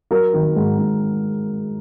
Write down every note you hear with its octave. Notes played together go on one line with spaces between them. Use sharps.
F#3 A#4
D#3
G#2
G#2